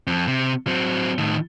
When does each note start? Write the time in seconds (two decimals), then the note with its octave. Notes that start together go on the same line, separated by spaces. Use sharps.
0.07 F2
0.28 C3
0.67 F#3 C4
1.18 A2 D#3